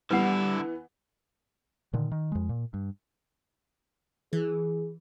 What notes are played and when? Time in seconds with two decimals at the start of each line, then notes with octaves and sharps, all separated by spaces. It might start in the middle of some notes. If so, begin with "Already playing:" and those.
0.11 D3 E3 G3 B3 E4 B4 F#5
1.93 A#2 D3 D#3
2.11 D#3
2.32 F2 G#3
2.49 A#2
2.74 G2
4.33 E3 G#4